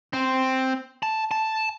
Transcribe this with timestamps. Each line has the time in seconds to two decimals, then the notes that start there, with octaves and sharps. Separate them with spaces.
0.13 C4
1.03 A5
1.31 A5